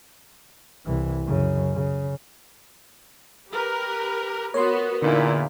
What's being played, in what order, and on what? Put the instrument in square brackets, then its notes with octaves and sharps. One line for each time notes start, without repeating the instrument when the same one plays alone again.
[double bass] C2 E3
F#2 C#3
C#3
[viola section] G4 A#4 B4
[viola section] B3 F#4 [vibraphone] A#4 [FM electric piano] C#5 C6
[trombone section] E2 A#2 [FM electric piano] D3 D#4 [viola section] E4